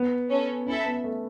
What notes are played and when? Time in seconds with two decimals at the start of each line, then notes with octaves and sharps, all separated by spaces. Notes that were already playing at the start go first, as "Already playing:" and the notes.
Already playing: B3
0.30 C#4 A4 C#5
0.66 C#4 E4
0.69 A4 E5
0.85 B3
1.04 A3